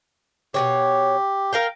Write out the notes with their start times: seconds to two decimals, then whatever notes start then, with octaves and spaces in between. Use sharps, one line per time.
0.54 B2 E3 G4 C#5
1.53 A#4 F5 G5